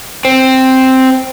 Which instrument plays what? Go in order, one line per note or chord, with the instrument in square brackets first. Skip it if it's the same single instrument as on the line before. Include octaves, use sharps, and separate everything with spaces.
[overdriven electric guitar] C4